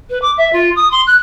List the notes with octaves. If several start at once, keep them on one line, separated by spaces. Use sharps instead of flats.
B4
D6
E5
F4
D#6
C6
F#6